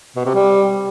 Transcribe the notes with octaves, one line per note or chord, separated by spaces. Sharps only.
B2
C3
G3